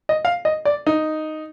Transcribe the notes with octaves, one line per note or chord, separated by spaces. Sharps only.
D#5
F5
D#5
D5
D#4